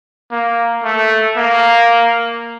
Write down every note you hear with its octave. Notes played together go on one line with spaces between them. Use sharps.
A#3
A3
A#3